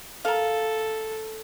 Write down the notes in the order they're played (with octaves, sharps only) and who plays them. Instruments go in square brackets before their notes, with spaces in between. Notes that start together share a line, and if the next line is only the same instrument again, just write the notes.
[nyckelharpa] A4 [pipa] A#4 F5